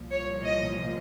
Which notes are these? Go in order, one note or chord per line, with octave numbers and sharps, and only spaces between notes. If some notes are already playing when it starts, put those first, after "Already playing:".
Already playing: C2 A#2 F3
C#5
D#5